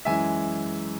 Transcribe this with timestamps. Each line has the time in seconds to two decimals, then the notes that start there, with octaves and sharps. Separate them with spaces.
0.05 F#2 E3 G#3 E5 G#5